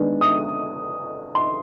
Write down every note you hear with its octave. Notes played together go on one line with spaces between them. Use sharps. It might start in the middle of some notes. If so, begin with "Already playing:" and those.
Already playing: D#3 G#3 B3 D4
D#6
C6